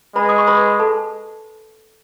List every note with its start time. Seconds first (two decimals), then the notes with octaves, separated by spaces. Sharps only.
0.16 G#3 B4 B5
0.29 D#6
0.38 C#6
0.48 B4 B5
0.80 A4 A5